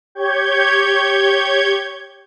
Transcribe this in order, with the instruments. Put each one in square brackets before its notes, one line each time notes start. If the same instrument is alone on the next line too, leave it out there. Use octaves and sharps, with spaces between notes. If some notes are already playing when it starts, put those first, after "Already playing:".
[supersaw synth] G4 C#5 G6 G#6